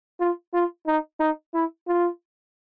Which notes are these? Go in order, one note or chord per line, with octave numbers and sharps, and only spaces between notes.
F4
F4
D#4
D#4
E4
F4